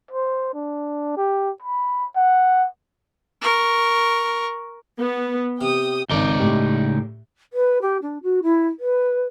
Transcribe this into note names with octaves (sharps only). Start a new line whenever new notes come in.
C5
D4
G4
B5
F#5
A#4 C#6
B3
C3 G5 D#6
G#1 C#2 D#4 D5 G7
A2 G4
B4
G4
D4
F#4
E4
B4